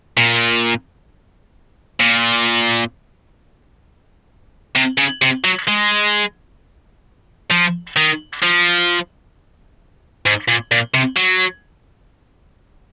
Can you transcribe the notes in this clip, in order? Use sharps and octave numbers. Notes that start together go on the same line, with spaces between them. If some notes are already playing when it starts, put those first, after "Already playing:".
A#2
A#2
C3
C#3
C3
F#3
G#3
F3
D#3
F3
G#2
A#2
A#2
C3
F#3